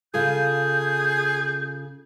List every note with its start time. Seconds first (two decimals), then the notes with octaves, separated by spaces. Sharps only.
0.14 C#3 F4 G#4 A4 G6